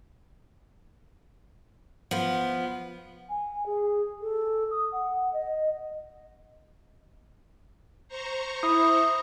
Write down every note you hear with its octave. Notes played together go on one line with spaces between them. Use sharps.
F3 B3
G#5
G#4
A4
D#6
F#5
D#5
C5 A#5 C#6
E4 D#6